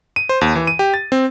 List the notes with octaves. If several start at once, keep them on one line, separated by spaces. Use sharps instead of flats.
D#7
C5
D#2
E3
D#7
G4
A6
C4